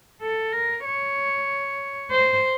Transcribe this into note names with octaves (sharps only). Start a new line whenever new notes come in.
A4
A#4
C#5
C5